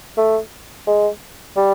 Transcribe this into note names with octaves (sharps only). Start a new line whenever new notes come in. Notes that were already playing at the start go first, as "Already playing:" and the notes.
A3
G#3
G3